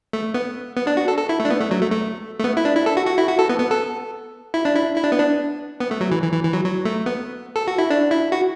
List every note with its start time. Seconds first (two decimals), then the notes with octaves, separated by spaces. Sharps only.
0.13 A3
0.34 B3
0.76 B3
0.87 D4
0.97 F#4
1.08 A4
1.18 A4
1.29 E4
1.40 A3
1.45 D4
1.50 B3
1.61 A3
1.71 F#3
1.82 A3
1.92 A3
2.40 A3
2.44 B3
2.57 E4
2.65 D4
2.76 E4
2.86 A4
2.97 F#4
3.07 F#4
3.18 E4
3.28 F#4
3.39 A4
3.49 B3
3.60 B3
3.71 A4
4.54 E4
4.65 D4
4.76 E4
4.96 E4
5.04 D4
5.12 B3
5.20 D4
5.80 B3
5.91 A3
6.01 F#3
6.12 E3
6.22 E3
6.33 E3
6.43 E3
6.53 F#3
6.65 F#3
6.85 A3
7.06 B3
7.56 A4
7.67 F#4
7.78 E4
7.90 D4
8.11 E4
8.32 F#4